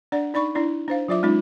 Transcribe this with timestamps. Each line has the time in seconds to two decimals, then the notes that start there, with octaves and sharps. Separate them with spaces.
0.12 D4 D5 F#5
0.34 D#4 D5 B5 C#6
0.55 D4 E4 D5
0.88 D4 C5 F5
1.08 F#3 F4 D5 E5 D6
1.23 G#3 C#4 D#4 F4